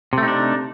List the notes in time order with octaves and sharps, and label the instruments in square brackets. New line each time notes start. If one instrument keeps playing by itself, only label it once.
[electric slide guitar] C3
A3
D#4
D4